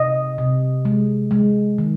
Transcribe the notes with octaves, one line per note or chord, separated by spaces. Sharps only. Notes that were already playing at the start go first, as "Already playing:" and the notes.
Already playing: C3 D#5
C3
G#3
G#3
D#3